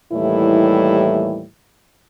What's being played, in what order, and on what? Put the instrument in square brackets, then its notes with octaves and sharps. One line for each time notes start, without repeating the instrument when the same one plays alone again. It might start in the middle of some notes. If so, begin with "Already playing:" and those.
[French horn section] D#2 A2 E3 G3 E4